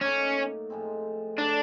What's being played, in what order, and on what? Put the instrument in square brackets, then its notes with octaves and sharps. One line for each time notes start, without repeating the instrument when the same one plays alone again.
[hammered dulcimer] A2 F#3 A#3 D#4 [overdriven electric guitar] C#4
[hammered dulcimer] A2 F3 G#3 C4
[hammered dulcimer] A2 F#3 A3 [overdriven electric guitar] D4